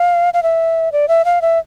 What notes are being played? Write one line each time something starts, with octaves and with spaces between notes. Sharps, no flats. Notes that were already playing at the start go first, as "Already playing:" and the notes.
Already playing: F5
F5
E5
D5
E5
F5
E5